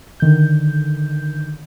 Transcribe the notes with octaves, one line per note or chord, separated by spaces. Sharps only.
D3 D#3 G6